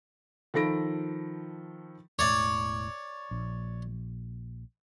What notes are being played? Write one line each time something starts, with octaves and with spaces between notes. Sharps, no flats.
D#3 F3 A4 B5 A#6 D7
E1 A2 C#5 D5
A#1